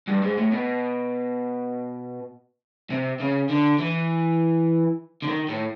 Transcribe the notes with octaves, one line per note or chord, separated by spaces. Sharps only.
G2
G#2
A2
B2
C3
C#3
D3
E3
D3
D#3
A2